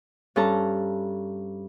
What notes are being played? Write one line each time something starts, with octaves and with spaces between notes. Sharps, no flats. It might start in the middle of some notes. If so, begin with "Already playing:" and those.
G2 C#4 A4 A5 A#5